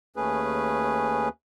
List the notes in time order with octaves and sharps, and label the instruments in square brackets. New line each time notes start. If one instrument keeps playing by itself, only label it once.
[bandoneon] D#2 A3 C#4 G#4 B4